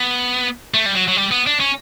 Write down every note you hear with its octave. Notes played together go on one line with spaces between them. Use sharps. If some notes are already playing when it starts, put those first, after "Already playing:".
Already playing: B3
A3
G3
F#3
F#3
G3
B3
D4
C#4